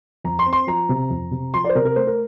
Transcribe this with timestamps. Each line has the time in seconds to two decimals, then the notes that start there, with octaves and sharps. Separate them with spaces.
0.24 F2 A#5
0.39 C6
0.46 C4
0.53 C6
0.67 F3 A#5
0.89 C3
1.10 F2
1.31 C3
1.54 F3 C6
1.65 C5 D5
1.75 C3 A#4
1.85 A#4
1.96 A3 C5
2.07 A#4